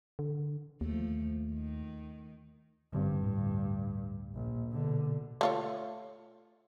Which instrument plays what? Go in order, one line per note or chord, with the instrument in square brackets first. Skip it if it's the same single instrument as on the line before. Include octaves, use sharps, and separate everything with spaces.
[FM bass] D3
[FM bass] D#2 [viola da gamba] F3 A3
[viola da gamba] D#3
[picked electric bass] A1 D3 C4 [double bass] G2
[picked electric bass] D2 A2
[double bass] A#1
B2 D3
[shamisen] A3 F4 C#5